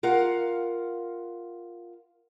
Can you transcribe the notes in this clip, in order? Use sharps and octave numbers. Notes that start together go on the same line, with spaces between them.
F4 A#4 F5 F#5